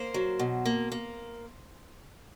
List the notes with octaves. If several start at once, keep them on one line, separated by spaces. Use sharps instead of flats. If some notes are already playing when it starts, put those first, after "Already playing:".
Already playing: A#3 C5
F#3
B2
A#3
A#3